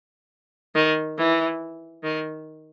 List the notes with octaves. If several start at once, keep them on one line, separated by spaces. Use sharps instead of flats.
D#3
E3
D#3